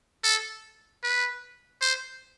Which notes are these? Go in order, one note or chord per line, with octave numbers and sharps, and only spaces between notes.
A4
B4
C5